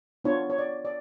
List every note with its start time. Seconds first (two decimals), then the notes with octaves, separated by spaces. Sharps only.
0.24 B3 D4 F4 C#5
0.50 C#5
0.58 D5
0.85 D5